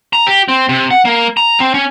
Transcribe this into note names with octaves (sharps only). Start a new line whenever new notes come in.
A#5
G4
C4
C3
F#5
A#3
A#5
C4
C#4